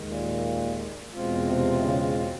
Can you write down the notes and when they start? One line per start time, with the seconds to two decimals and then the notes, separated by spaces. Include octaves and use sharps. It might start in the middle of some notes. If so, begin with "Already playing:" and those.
Already playing: D#2 D#3 G#3
0.11 A#2
1.14 E2 B2 G#3 C4 F4
1.47 C3
1.82 C#3